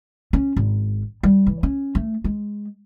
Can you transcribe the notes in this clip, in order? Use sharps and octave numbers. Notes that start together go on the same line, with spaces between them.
C#4
G#1
G3
E3
C#4
A3
G#3